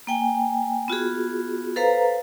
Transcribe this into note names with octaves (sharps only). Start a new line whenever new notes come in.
A#3 G5 G#5
B3 F4 F#4 G#4
A4 B4 C5 F5 A#5